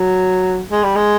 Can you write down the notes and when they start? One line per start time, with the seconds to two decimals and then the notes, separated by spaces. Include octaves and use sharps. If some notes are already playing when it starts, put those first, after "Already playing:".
Already playing: F#3
0.70 G#3
0.83 G3
0.96 G#3